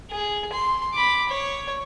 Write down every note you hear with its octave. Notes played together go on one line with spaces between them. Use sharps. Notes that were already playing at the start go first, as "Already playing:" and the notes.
G#4
C6
B5 D6
C#5